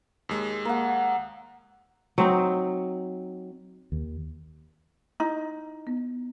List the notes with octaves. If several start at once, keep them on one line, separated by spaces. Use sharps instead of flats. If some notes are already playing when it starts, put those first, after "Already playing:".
D#2 G#3
A#3 F#5
F#3 C4 D#4
D#2
D#4 E4
B3